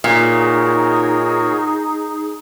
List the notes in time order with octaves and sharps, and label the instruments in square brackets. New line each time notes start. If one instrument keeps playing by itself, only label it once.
[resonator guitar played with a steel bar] A#2 [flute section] D#4 G#4 [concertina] F#4 A#4 C#5